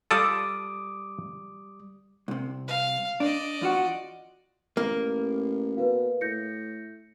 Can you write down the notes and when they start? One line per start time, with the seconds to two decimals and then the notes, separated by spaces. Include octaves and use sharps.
0.11 G3 F4 A4 D5 D6 D#6
2.28 C2 C3
2.67 F5
3.20 D4 D5 D#5
3.61 E2 F4 F#4
4.77 A1 A#3
5.77 B2 B4 F5
6.21 A2 G6 A#6 C#7